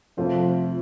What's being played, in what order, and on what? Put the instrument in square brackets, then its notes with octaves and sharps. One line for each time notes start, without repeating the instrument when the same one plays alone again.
[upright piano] F2 C3 A3 F4 C5 [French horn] F3